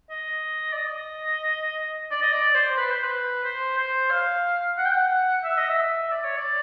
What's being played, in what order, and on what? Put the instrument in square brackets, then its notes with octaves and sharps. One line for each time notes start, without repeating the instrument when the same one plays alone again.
[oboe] D#5
D5
D#5
D5
D#5
D5
C5
B4
C5
B4
C5
C5
F5
F#5
G5
F#5
E5
D#5
E5
D5
C#5
D5